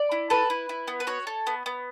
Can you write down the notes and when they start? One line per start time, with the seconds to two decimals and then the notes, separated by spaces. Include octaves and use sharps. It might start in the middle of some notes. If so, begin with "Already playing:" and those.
Already playing: D5
0.12 E4
0.30 A4 B4
0.50 E4
0.69 E4
0.88 B3
1.00 B4
1.07 F#4 C#5
1.27 A4
1.47 B3
1.66 B3